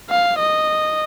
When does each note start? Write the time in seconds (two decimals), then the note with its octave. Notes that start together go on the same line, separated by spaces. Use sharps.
0.10 F5
0.39 D#5